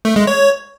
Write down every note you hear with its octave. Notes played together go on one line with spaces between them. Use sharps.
A3
G#3
C#5